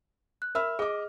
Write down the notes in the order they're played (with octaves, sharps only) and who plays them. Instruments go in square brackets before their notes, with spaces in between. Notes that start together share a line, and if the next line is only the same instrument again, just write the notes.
[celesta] F#6
[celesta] A#4 E6 [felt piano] E5 B5 F6
[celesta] G#4 [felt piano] D#5 D6